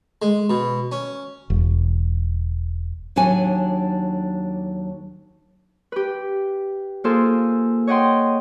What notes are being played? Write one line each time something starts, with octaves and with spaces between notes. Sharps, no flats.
G#3
B2
C#4
E1
D#2 F#3 D4 D#4 G#5
G4 B4
A#3 F4 G#4 A4 C5
C#5 D#5 F#5 G5 C6